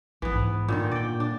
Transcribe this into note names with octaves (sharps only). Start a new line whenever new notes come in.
A#1 E3 B3
G#2
A#2 D3 D#3
A#2 D5 G5
D4